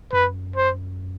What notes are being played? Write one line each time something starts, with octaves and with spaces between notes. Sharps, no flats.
F#2 B4
C5